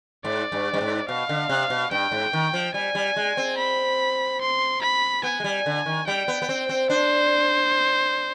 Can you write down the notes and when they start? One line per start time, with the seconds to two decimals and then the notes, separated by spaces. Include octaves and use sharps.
0.25 G#2 D5
0.52 G2
0.74 G2
0.81 G#2
1.08 B2 F5
1.29 D3
1.49 C3
1.70 B2
1.91 G2 G5
2.12 G#2
2.33 D#3
2.54 F3
2.74 G3 G#5
2.95 G3
3.16 G#3
3.37 C4
3.58 B5
4.41 C6
4.82 B5
5.23 B3 G#5
5.40 G#3
5.44 G3
5.66 D3
5.86 D#3
6.07 G3 G5
6.28 B3
6.42 B3
6.49 C4
6.69 C4
6.90 D4 C5